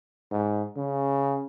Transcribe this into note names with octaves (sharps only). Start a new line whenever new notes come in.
G#2
C#3